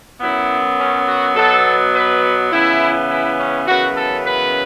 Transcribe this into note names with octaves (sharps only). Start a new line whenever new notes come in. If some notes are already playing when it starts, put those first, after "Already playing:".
F#2 F#3 B3 E4
C#4
F#4
B2 F#3 B3 A4
B4
C#3 E3 B3 E4
E4
C#4
F#2 C#3 E3 B3 F#4
A4
B4